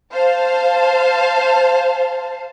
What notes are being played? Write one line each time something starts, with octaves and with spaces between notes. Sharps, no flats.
C5 F5 A5